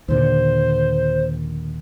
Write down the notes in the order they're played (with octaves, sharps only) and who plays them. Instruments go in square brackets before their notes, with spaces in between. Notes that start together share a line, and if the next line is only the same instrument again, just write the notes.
[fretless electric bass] D#2 A#2 D3 [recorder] C5